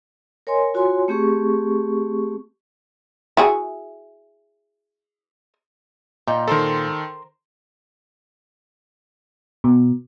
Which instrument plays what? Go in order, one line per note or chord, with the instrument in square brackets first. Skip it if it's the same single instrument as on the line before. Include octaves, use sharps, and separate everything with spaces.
[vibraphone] A#4 C#5 D#5 G#5 C6
F4 F#4 C#5 G#5 C6
A3 C4 G4 G#4 C#6
[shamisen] E4 F#4 G#4
[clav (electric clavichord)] A#2 [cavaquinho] D#4 G5
[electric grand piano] D#3 A4 [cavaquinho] A#4 C5 A#5
[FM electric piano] B2